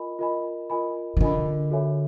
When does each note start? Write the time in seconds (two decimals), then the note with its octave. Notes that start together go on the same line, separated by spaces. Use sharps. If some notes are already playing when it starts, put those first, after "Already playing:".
Already playing: F4 A#4 D#5 G#5 B5
0.19 F4 A#4 D#5 G#5 B5
0.70 F4 A#4 D#5 G#5 B5
1.17 D#3
1.21 D3 F4 A#4 D#5 G#5 B5
1.71 F#4 A4 C#5 E5 G#5